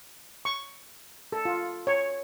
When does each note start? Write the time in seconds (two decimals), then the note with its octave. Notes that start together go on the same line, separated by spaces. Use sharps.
0.45 C#6
1.32 A4
1.45 F4
1.87 C#5